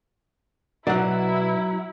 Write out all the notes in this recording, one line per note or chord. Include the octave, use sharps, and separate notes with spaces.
B2 F#3 D#4 E4 D5 F#5